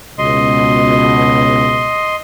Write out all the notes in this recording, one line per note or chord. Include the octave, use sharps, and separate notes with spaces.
C#2 B2 D#5 C6